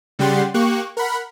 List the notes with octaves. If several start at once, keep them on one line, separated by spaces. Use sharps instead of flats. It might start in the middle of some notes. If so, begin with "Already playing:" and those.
C#3 G3 G4 F#5 C6 A6
A#3 G4 C#6 F#6
A#4 F#5 B5